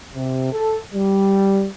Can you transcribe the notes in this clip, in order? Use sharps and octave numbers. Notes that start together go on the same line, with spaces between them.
C3
A4
G3